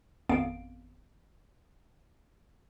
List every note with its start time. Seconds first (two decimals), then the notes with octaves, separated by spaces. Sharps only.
0.29 G#1 F2 B3 F5 D7